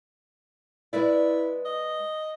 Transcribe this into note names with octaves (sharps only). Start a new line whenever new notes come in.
G#3 E4 B4 D5
D#5